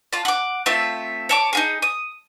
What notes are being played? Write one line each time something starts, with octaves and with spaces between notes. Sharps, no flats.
F4 A5
F#5 D6
A3 C4 F4 E5
C#5 A5 D6
D#4 F4 G#4
D#6